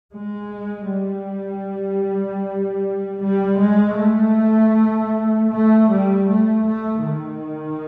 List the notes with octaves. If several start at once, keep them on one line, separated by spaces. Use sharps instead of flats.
G#3
G3
G3
G#3
A3
A3
G3
A3
A3
D#3